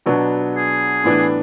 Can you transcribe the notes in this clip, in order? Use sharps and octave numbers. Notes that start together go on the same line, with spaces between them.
B2 F#3 B3 D4
G#4
A2 E3 B3 D4